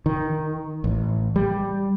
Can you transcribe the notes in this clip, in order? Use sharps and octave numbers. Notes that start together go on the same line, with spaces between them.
D#3
A1
G3